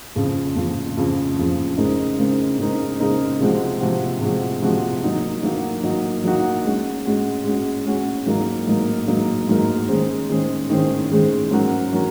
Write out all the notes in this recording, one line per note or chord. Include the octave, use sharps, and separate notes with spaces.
F2 C#3 F3
F2 C#3 F3
F2 C#3 F3
F2 C#3 F3
C#3 G#3 C4 D#4 A#4
C#3 G#3 C4 D#4 A#4
C#3 G#3 C4 D#4 A#4
C#3 G#3 C4 D#4 A#4
C3 F3 G#3 C4 F#4
C3 F3 G#3 C4 F#4
C3 F3 G#3 C4 F#4
C3 F3 G#3 C4 F#4
F#3 A#3 D#4 F#4
F#3 A#3 D#4 F#4
F#3 A#3 D#4 F#4
F#3 A#3 D#4 F#4
G#3 C#4 F#4
G#3 C#4 F#4
G#3 C#4 F#4
G#3 C#4 F#4
G#2 F#3 A#3 D#4 A#4
G#2 F#3 A#3 D#4 A#4
G#2 F#3 A#3 D#4 A#4
G#2 F#3 A#3 D#4 A#4
D#3 G#3 C#4 G#4 C5
D#3 G#3 C#4 G#4 C5
D#3 G#3 C#4 G#4 C5
D#3 G#3 C#4 G#4 C5
G#2 F#3 C#4 F#4 A#4
F#3 C#4 F#4 A#4